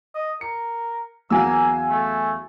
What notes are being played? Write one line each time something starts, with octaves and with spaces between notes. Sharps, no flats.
D#5
A#4 C#7
E2 F#3 A#3 F#4 F5 G#5 E6
A3